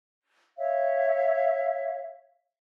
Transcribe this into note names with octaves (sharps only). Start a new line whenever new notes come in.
C#5 E5 F5